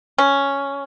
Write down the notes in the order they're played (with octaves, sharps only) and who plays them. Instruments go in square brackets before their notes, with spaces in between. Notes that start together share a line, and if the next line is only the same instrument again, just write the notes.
[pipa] C#4